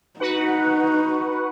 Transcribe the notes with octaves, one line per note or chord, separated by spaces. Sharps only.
D#4 F#4 B4 F#5